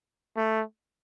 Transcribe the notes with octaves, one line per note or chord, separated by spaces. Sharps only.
A3